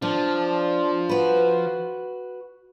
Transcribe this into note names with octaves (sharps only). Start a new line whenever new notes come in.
F3 D4
F#4 B4